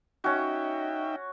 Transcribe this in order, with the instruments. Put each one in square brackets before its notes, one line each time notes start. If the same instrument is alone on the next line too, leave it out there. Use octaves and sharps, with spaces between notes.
[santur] C#4 F#4 [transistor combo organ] D#4 E5 G5